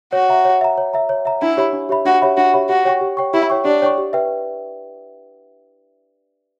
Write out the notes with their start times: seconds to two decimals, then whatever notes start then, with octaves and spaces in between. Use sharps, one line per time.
0.13 F#4 C#5
0.29 E5 A#5
0.45 C#5
0.61 E5 A#5
0.78 C#5
0.94 E5 A#5
1.09 C#5
1.25 E5 A#5
1.42 D4 E4
1.57 G4 C#5 E5 B5
1.73 D4
1.89 G4 C#5 E5 B5
2.05 D4 F#4
2.22 G4 C#5 E5 B5
2.37 D4 F#4
2.54 G4 C#5 E5 B5
2.69 F#4 G4
2.85 C#5 G5 C#6
3.01 G4
3.17 C#5 G5 C#6
3.34 E4 G4
3.50 C#5 G5 C#6
3.65 D4 G4
3.82 C#5 G5 C#6
3.98 G4
4.13 B4 E5 G5